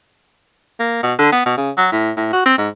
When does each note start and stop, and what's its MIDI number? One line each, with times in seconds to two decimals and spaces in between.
0.79 1.01 58
1.03 1.13 47
1.19 1.29 50
1.32 1.43 59
1.45 1.53 47
1.57 1.70 49
1.77 1.87 54
1.92 2.11 45
2.17 2.31 45
2.33 2.44 66
2.46 2.57 60
2.58 2.68 44